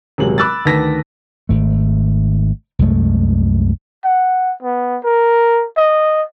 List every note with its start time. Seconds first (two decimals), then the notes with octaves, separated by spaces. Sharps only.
0.18 D#1 C3 F#3 G#3 F#7
0.38 B5 D6 E6 F#6 A6
0.65 D2 D#3 B4 A5 A#6 B6
1.49 G#1 A3
2.79 C2 F#2 G#3 A3
4.04 F#5
4.63 B3
5.04 A#4
5.77 D#5